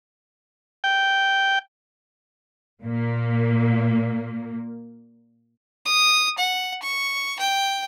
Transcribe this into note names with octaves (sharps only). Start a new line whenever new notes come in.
G5
A#2 A#3
D#6
F#5
C#6
G5